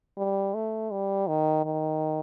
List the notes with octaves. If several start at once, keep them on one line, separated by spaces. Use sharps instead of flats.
G3
A3
G3
D#3
D#3